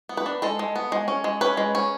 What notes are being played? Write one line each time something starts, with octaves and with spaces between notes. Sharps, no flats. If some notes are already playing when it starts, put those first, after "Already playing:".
B3
B4
D4
G#3 A4
G#3
B3
G#3
C#4
G#3
C#4 B4
G#3
C#4